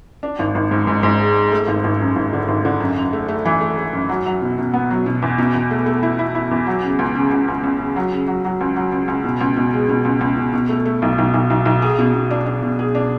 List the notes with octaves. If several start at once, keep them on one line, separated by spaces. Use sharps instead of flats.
D4
G#1
G#1
G#2
G#2
G#2
G#3
G#3
A3
G#1
G#1
F#2
G#1
D3
G#1
D3
F#2
F#2
A3
A3
E3
A3
A3
F#2
F#3
F#3
B2
B2
B3
F#3
B2
E2
B2
E2
A3
A3
E4
E4
E4
E2
F#3
C#3
C#2
C#3
C#2
C#2
C#2
C#3
F#3
C#3
F#3
F#3
C#2
F#3
C#2
C#2
B2
C#2
B2
G#3
B2
C#2
C#2
B2
B2
A3
A3
B1
B1
B1
B1
B1
G#4
B2
B2
D4
D4
B2
G#4
D4